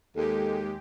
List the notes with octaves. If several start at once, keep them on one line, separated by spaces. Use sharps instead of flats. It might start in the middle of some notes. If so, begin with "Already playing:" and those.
D#2 G#3 G4 A4